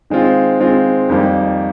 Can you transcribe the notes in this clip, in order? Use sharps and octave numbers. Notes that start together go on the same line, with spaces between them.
D#3 G#3 C4 F4
D#3 G#3 C4 F4
F2 D#3 G3 A#3